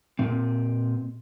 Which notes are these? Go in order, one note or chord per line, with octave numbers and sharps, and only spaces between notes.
A#2 C4